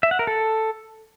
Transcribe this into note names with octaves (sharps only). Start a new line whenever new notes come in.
E5
F#5
A#4
A4